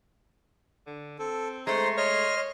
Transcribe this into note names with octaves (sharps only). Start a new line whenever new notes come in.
D3
C4 A4
G#3 A3 C5 A#5 C6
C#5 D#5 C6 F6
C#5